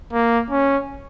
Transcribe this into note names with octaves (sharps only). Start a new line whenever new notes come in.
A#3
C#4